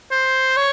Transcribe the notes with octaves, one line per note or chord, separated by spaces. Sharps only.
C5
C#5